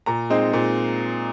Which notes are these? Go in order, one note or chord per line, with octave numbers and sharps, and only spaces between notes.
A#2 A#5
G#3 C4 D#4
A#2